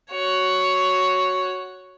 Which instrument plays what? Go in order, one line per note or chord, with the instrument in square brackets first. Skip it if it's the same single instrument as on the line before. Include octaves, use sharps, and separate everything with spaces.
[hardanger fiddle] F#4 C#5